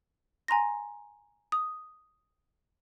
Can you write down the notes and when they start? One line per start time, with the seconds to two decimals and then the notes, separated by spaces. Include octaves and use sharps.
0.48 G#5 A#5 C6 A#6
1.52 D#6